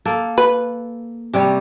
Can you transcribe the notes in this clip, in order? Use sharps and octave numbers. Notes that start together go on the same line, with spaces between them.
A#3 A4
B4
C3 G3 C#5